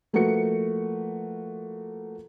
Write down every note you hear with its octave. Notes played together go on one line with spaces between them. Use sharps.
F3 A3 A#3 F#4 B4 C#7